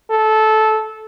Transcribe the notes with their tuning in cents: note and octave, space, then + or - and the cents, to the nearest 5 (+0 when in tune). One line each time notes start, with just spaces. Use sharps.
A4 -15